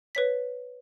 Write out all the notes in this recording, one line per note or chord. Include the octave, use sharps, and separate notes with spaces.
B4 C#5 B6